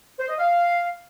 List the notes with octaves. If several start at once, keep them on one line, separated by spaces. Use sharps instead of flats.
C5
D#5
F5